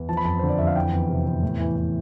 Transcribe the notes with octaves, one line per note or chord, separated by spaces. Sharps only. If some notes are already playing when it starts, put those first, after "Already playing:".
Already playing: E2
F3 A5
B5
F2 A5
D3 C5
D5
F2 E5
F5
E3 G5
E2
C3
E2
A2
E3
E3